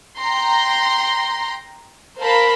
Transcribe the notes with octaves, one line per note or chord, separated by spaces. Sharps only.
G5 A#5 C6
A#4 C5 F5 A5 B5